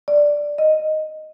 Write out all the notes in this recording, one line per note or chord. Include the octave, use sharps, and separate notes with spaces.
D5
D#5